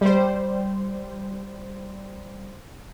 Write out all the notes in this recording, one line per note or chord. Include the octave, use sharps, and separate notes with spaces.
G3 C5